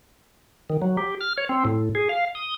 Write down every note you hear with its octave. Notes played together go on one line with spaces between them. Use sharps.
D#3
F#3
G4
F6
C#5
C4
A2
G#4
F5
D#6